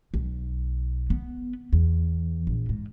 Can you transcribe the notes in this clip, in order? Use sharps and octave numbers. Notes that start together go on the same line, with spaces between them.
B1
B3
E2
A#1
G#2